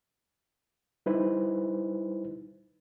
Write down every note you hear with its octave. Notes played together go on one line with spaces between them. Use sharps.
G3 D#4 E4 B4 C5